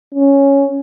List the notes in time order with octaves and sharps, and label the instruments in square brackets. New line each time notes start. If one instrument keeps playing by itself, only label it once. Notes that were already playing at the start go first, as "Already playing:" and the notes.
[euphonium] C#4